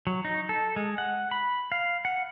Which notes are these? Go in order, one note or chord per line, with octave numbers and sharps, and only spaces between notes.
F#3
D#4
A4
G#3
F#5
B5
F5
F#5